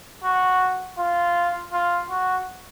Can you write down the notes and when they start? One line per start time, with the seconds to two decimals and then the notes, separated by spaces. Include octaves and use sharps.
0.24 F#4
0.98 F4
1.72 F4
2.10 F#4